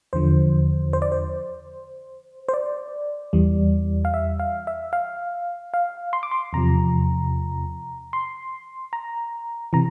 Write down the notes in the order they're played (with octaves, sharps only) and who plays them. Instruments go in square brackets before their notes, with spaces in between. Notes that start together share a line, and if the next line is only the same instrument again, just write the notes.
[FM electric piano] E2 D3 F3 C5
C5
D5
C5
C5
D5
E2 E3 G3
F5
E5
F5
E5
F5
F5
C6
D6
C6
E2 C3 F3 A#5
C6
A#5
C3 E3 A#5